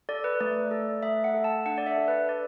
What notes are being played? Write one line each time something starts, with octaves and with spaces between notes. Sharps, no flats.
A4 D5
B4
A3 D5
A4
A3 E5
F#5
A4
A5
D4 F#5
D5
E5
A4
B4
A4 D5